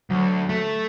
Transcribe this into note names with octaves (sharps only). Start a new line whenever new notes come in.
D2 F#3
A3